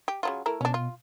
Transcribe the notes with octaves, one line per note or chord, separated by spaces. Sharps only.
G4
C#3 F#3 F4
A3 E4 A#4
B2 C#4 D4
F4